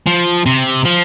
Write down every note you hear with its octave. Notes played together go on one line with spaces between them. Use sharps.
F3
C3
F3